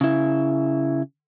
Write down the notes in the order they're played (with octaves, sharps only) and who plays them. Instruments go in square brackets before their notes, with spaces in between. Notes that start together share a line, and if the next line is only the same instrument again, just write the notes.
[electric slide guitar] C#3 E4